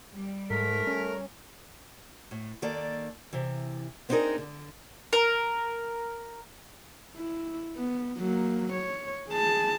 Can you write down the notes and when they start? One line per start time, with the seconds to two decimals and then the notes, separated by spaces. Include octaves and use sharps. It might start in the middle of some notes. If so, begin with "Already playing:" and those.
0.14 G3
0.50 G#2 A3 A#4 B6
0.87 C#4
2.31 A2
2.62 D#3 A#3 A4 D5
3.33 C3 E3
4.09 B3 C4 D4 D#4 G#4 A#4
4.38 D3
5.13 A#4
7.17 E4
7.76 B3
8.17 F#3 A#3
8.72 C#5
9.28 G#4 A5